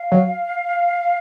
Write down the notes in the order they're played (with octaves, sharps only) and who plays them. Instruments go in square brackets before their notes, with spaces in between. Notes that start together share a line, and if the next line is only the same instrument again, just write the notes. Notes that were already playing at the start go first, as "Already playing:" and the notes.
Already playing: [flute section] F5
[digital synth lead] F#3